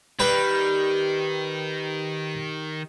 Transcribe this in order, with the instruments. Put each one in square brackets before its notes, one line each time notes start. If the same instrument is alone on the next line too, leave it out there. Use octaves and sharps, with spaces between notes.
[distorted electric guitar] D#3 [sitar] G3 [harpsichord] B4 G5